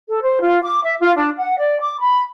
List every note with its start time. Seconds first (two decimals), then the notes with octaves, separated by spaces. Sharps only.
0.09 A4
0.22 C5
0.41 F4
0.62 D6
0.84 E5
1.00 F4
1.17 D4
1.37 F#5
1.57 D5
1.80 D6
1.99 B5